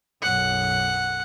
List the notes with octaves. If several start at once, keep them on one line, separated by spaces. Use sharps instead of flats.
B1 F#2 F#5